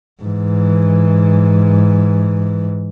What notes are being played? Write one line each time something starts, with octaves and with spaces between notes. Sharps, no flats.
G#2 E3